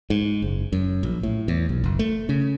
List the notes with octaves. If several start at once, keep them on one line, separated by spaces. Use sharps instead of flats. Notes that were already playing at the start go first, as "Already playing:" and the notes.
G#2
F#1
F#2
A#1
A2
E2
B1
F#1
A3
C#3